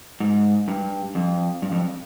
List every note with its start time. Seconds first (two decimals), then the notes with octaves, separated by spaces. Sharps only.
0.20 G#2
0.68 G2
1.15 F2
1.62 G2
1.72 F2